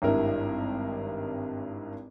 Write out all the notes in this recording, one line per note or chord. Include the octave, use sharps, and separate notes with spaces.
G#1 G2 E4 A#4